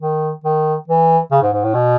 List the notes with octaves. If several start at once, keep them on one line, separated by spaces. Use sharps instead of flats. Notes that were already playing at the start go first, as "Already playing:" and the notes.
D#3
D#3
E3
C#3
G#2
G#2
A2
B2